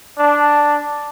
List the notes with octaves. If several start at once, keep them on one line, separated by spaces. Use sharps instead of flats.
D4